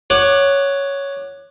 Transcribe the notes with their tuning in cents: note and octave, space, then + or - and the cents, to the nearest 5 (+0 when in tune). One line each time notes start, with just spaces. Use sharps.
C#5 +5 F#5 +0 D6 +25